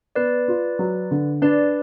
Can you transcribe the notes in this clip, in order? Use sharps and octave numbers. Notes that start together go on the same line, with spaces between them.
B3 B4 D5
F4
F#3
D3
D4 B4 D5